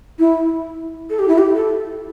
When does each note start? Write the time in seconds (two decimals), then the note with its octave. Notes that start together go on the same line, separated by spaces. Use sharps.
0.19 E4
1.09 A4
1.19 G4
1.28 E4
1.38 G4
1.55 A4